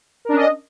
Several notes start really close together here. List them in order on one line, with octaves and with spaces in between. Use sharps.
A#4 D4 C#4 D#5